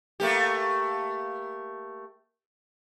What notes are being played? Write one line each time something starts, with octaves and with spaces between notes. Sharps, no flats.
A3 A#3 G4